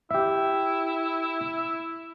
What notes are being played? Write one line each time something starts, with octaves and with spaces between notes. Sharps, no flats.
E4 G4 E5